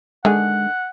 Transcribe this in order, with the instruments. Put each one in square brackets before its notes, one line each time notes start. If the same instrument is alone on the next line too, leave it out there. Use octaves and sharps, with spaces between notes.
[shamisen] D3 D#3 G#4 [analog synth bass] G#3 [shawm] F#5